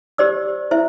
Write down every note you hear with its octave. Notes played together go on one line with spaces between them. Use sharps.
G4 C5 D5 E6
E4 C5 E5